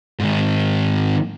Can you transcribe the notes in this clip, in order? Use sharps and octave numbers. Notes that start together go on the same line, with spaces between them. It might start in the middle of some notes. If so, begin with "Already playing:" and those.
G#2 D#3